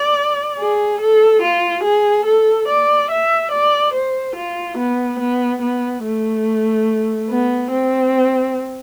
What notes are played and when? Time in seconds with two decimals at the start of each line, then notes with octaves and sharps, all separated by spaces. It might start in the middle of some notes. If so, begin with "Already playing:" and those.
Already playing: D5
0.59 G#4
1.00 A4
1.42 F4
1.83 G#4
2.25 A4
2.68 D5
3.10 E5
3.51 D5
3.94 C5
4.35 F4
4.77 B3
5.19 B3
5.62 B3
6.04 A3
7.30 B3
7.71 C4